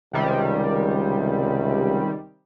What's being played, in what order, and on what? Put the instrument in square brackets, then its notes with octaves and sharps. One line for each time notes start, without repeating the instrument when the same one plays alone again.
[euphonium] C#2 [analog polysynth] C3 D#3 G3